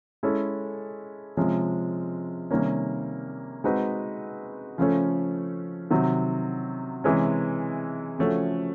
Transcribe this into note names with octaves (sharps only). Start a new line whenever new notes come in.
G#3 C#4 E4 A4
C3 F3 G#3 C#4
C3 D#3 G3 A#3 C#4
G#3 C4 D#4 F#4 B4
C#3 F3 A3 C#4
C3 D#3 F#3
C3 E3 G#3 C#4
C#3 F3 A3 C#4 F#4